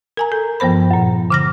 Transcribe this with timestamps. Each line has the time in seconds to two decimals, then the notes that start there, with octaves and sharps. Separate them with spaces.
0.17 A#4 G#5 A#5
0.32 A4
0.60 G2 F3 B3 C5 B5
0.91 F#2 A#2
1.30 D3 F6 A#6